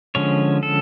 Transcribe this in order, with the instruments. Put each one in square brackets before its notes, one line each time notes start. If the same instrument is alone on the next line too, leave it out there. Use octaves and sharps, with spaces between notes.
[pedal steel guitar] D3 F3 G#3 C#4 C#5
A4